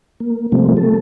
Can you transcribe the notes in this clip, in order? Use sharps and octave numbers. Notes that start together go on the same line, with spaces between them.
A#3
C3 F3 G3 A3 A#3 C4
A3 A4